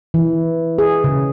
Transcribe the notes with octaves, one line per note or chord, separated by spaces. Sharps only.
E3
G#4
C#3